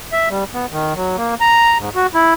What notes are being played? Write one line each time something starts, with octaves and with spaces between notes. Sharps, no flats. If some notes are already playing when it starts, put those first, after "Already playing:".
E5
G3
B3
D#3
F#3
A#3
A#5
G#2
F#4
E4